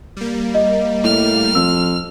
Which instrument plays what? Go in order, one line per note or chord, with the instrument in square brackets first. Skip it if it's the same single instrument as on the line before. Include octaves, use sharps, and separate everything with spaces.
[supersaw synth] G3 A#3
[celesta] D#5
[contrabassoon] A2 [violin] F6
[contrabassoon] F2 [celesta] E6